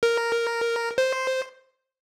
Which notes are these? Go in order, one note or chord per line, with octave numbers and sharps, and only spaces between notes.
A#4
C5